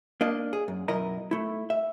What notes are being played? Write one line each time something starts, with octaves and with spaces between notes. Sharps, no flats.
A#3 D4 D#5
G#4
F#2
B1 F#2 E4 A#4 D#5 A#5
A3 E4
E5